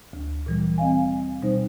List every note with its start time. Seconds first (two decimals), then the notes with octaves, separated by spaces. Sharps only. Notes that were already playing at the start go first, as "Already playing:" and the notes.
0.13 D2
0.46 A#2 E3 G3
0.78 C4 D#5 F5 G#5
1.42 B2 G3 D#4 C5